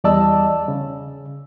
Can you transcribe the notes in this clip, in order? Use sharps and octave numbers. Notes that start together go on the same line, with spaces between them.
E2 G3 D5 D#5 A5 E6
C#3